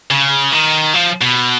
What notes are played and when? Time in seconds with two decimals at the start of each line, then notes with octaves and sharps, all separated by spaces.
0.11 C#3
0.52 D#3
0.94 F3
1.21 B2